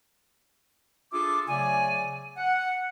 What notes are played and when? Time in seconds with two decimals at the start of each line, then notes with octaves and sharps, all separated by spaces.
1.12 D4 F4 G#4 A4 E5 D6
1.47 C#3 F#3 A3 D5 G#5
2.36 F#5